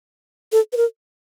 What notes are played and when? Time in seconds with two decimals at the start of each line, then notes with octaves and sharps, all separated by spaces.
0.52 A4
0.73 B4
0.77 A#4